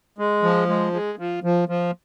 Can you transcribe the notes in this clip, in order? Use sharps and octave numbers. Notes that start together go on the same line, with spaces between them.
G#3
F3
G#3
G#3
F3
F3
F3